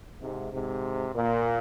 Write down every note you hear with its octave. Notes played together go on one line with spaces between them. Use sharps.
G#2 C3
G#2 C3
A#2